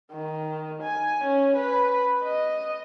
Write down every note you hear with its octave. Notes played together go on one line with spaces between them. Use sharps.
D#3
G#5
C#4
B4
D#5